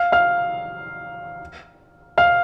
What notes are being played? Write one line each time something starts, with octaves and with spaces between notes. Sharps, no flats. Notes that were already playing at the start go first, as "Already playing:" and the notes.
Already playing: F5 F6
F5 F6
F5 F6